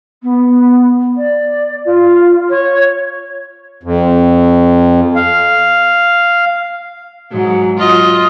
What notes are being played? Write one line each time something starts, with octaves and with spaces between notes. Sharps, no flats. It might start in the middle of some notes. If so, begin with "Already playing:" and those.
B3
D5
F4
C#5
F2
F5
G#2 F#3
F4 D#5